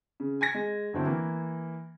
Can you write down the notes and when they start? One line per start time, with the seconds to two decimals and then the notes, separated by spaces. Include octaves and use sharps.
0.20 C#3
0.41 G#5 G#6 A#6
0.54 G#3
0.93 G1 D3 F#3 C4 D4 E4
1.06 E3 A#3